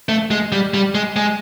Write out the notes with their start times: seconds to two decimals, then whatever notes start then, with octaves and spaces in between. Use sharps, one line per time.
0.09 A3
0.31 G#3
0.52 G3
0.74 G3
0.95 G#3
1.16 G#3